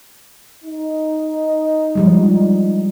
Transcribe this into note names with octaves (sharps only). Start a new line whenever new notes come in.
D#4
F3 G3 G#3